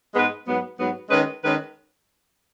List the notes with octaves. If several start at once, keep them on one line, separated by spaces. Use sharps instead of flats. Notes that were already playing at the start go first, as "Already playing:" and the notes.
G#2 G#3 B3 G#4 B4
G#2 F#3 B3
G#2 F#3 B3
D#3 G#3 C#4 B4
D#3 G#3 C#4 B4